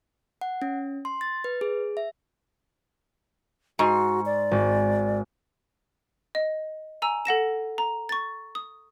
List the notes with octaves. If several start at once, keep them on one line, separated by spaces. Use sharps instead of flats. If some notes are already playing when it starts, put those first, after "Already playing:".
F#5
C#4
C6
A6
B4
G#4
E5
G#2 F#4 C6 C#6
D5
G#1
D#5
G#5 A#5 E6
A4 F#5 A#6 E7
A#5
C#6 A6
D#6